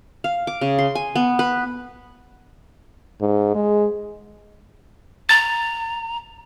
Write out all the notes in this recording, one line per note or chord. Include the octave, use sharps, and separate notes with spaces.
F5
D6
C#3
C6
G#5
B3
B4
G#2
G#3
A#5 A6